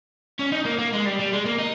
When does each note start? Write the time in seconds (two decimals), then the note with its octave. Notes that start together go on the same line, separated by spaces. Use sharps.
0.39 C#4
0.52 D#4
0.65 A#3
0.79 A#3
0.93 G#3
1.05 G3
1.19 G3
1.33 G#3
1.45 A#3
1.59 D#4